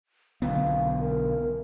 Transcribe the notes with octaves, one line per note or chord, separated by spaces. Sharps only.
B1 D3 B3 F5
A#4